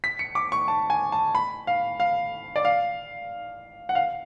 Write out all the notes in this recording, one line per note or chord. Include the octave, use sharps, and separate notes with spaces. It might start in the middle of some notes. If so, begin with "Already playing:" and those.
B6
C#7
D6
C#6
A5
G#5
A5
B5
F5
F5
D5
F5
F#5
F5